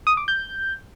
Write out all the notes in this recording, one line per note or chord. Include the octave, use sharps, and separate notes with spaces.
D#6
D6
G6